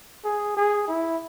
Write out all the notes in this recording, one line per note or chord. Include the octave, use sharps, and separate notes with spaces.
G#4
G#4
E4